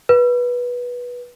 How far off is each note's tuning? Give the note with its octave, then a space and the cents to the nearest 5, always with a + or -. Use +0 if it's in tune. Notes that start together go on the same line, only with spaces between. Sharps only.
B4 -15